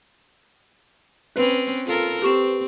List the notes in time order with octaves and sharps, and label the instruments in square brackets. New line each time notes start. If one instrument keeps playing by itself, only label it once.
[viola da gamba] C4 C#4 [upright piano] B4
[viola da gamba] F4 A4 A#4
[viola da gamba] C4 [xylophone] G4 C#6 E7